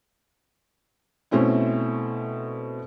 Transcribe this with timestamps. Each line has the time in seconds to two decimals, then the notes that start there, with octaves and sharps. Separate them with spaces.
1.31 B2 A3 C4 C#4 E4